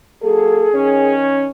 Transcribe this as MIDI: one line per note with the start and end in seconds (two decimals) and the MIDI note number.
0.22 0.69 54
0.22 0.69 58
0.22 1.14 68
0.22 0.69 69
0.74 1.48 51
0.74 1.48 61